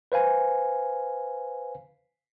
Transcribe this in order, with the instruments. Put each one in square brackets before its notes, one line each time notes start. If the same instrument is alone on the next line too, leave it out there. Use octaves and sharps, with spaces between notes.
[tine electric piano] B4 C5 F5 G#5